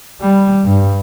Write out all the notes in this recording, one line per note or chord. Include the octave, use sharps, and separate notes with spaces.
G3
G2